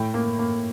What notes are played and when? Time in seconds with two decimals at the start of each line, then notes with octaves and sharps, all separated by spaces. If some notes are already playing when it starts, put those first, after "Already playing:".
Already playing: A2 G5
0.14 A#3
0.39 A#3